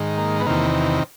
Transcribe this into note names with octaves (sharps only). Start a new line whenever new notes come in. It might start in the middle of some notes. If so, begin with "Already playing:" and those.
Already playing: G#2 D#3
A#3
B3
E2 C3 D#3 A#3